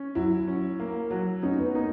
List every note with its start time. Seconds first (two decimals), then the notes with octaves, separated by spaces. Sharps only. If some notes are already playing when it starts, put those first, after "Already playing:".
Already playing: C#4
0.15 F#3 E4
0.48 C#4
0.80 A#3
1.11 F#3
1.43 C#4 D#4
1.59 B3
1.75 A#3 D#4